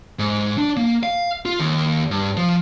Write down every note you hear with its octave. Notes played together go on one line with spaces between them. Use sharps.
G#2
D4
A#3
F5
F4
D#2
G2
F3